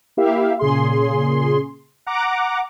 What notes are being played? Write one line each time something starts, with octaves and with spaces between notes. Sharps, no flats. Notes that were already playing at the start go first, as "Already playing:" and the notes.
A#3 E4 G4 E5 F5
A#2 C#3 G#4 C6
F#5 A#5 D6